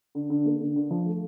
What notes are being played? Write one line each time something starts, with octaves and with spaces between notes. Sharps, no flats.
D3
D3
A#3
D3
D3
F3
A3